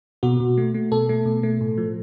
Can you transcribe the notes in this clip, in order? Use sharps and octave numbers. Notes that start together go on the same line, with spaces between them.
B2 F#4
B2
A3
A3
B2 A4
A3
B2
A3
A2
F3